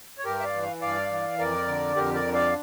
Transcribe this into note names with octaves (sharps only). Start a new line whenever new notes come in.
C#5
G2 G4 A#4
E5
D5 F5
E3
F5
G2 D5 F5
E3
F2 A#4 D5
D3
F2 G4 A#4
A#4 D5
D3
D5 F5